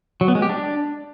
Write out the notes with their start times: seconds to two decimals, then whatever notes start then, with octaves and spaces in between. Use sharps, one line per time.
0.21 F#3
0.28 B3
0.35 G#3
0.42 G4
0.49 D4